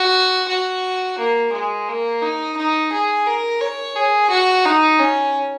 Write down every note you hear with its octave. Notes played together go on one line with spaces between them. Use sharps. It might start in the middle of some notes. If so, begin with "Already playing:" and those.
Already playing: F#4
F#4
A#3
G#3
A#3
D#4
D#4
G#4
A#4
C#5
G#4
F#4
D#4
C#4